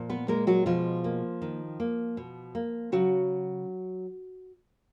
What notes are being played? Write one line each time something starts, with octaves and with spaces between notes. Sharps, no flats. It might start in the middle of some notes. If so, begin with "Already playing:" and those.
Already playing: A#2 F3
B3 B4
G#3 A#3 A#4
F#3 F#4
B2 F3 F4
A#3
D#3
A#3
B2
A#3
C#3 F#3 F#4